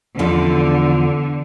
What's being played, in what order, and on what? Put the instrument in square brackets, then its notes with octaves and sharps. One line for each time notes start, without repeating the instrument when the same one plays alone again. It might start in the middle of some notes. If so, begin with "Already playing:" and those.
[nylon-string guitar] E2 F3 [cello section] D3